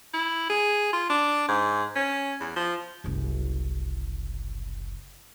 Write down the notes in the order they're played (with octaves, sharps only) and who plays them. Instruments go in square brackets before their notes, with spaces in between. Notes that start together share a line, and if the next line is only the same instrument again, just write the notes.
[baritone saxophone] E4
G#4
F4
D4
G#2
C#4
E2
F3
[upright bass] F#1 C2